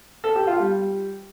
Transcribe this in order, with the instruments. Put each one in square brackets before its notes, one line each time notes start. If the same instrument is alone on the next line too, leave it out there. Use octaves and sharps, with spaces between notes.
[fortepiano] A4
G4
F4
G3